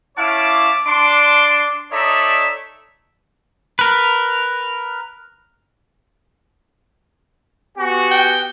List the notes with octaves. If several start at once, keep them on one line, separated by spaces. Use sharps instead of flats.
C#4 E4 C#5 F5 A5 D6
D4 C6 D6
D#4 A4 C#5 D5 E5 A#5
A#4 B4
B3 F#4 G4 G#5
G5